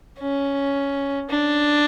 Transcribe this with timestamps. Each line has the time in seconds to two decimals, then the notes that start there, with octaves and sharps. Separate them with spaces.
0.19 C#4
1.30 D4